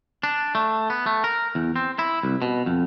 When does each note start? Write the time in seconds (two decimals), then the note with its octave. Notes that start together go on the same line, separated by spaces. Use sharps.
0.23 D4
0.55 A3
0.90 B3
1.06 A3
1.24 A#4
1.55 E2
1.76 C4
1.99 E4
2.23 C2
2.42 B2
2.66 F2